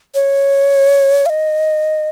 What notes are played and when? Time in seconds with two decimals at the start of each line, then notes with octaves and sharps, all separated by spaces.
0.15 C#5
1.26 F5
1.29 D#5